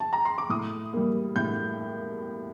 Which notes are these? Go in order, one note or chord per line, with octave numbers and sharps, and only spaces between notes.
A5
A#5
C6
D6
A2 D#6
G3 A#3
A2 G6